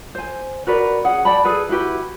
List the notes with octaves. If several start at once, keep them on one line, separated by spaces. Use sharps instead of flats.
C5 G#5
F#4 A#4 B4 D5
C#4 G#4 F#5
D5 G5 A5 B5
G#4 A4 B4
E4 F#4 G4 B4